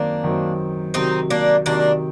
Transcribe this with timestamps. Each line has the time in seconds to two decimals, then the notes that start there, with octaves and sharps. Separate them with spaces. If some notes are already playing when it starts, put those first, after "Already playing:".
Already playing: F#2 D#3 F#3 A#3 C4 D4
0.23 F#2 D#3 F#3 C4
0.94 C3 D#3 F#3 C4 D#4
1.30 A#3 D4
1.66 C3 D#3 F#3 A#3 D4